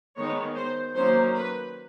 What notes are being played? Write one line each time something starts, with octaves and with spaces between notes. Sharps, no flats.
D#3 G#3 B3 C#5
C5
D#3 F#3 A#3 C#4 C5
B4